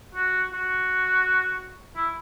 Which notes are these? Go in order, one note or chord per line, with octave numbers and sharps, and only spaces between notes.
F#4
F#4
E4